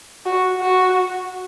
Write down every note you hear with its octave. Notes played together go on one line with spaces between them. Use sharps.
F#4
F#4